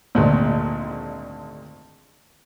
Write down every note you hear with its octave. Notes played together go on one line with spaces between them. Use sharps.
G#1 D2 A#2